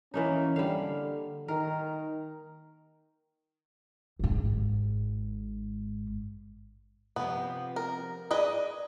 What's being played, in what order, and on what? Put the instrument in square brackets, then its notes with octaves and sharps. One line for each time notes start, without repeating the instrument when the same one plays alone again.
[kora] E3 A#3 D#4 [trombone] C#4
[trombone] D3 [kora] G3 F5
[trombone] D#3 [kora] A#4
[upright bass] G#1 G#2
[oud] C3 F3 [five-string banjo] B3
[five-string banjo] A#4
[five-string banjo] G#4 B4 D#5 [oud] D5